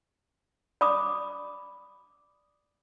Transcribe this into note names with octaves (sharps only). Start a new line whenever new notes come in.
D5 B5 D6 D#6